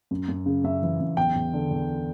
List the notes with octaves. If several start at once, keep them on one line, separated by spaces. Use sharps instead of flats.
F#2
F#2
C#3
F#2 E5
E3
F#2
E2 G5
E2
D3
E2